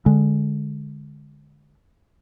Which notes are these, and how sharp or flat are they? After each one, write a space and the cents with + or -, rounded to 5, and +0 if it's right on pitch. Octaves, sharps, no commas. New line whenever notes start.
D3 +0 G#3 +0